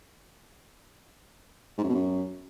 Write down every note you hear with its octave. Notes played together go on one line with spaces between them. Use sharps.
G#2
F#2
B2
F#2